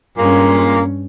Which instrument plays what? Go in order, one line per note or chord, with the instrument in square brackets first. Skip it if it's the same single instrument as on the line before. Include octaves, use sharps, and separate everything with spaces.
[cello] G2 C#4 [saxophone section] A#2 G#3 A#3